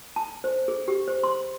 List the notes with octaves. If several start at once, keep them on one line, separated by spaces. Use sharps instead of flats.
A5
C5
G#4
G4
C5
C6